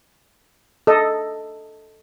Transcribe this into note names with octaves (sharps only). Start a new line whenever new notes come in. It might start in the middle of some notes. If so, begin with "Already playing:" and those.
A4 D#5